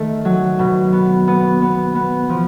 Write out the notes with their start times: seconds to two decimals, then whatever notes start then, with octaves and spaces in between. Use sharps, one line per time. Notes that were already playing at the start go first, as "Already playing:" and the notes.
Already playing: D#3 A3
0.25 F#3
0.59 B2
0.93 B3
1.27 B3
1.61 B3
1.95 B3
2.29 F3